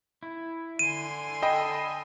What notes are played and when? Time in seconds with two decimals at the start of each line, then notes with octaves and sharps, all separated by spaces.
0.23 E4
0.79 D3 G#5 C6 D#7
1.42 A4 D#5 G5 B5